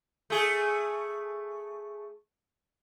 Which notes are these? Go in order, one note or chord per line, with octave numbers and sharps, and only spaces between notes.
A3 G#4